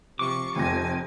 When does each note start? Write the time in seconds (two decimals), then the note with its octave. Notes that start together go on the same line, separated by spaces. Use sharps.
0.19 C3 F3 C#6 D6
0.56 F1 F2 C3 G#5 A#6